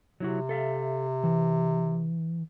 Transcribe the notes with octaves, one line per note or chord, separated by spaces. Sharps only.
C3 F#3 E4 F#4
A4 E5 F5
E3